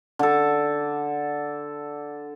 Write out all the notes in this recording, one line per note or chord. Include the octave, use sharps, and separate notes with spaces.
D3 A4